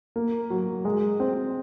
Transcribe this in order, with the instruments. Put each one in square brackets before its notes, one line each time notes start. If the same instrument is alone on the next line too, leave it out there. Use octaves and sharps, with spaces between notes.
[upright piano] A#3
F#3
G#3
C4